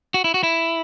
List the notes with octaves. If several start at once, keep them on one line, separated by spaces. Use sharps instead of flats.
F#4
E4
F#4
E4